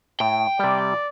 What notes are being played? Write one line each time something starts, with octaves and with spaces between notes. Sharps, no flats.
A2 G5
C3 G3 D5